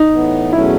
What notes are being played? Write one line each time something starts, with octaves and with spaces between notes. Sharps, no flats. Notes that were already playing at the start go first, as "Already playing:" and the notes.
Already playing: D#4
A2 E3 B3
E2 B2 F#3 A3 C#4 E4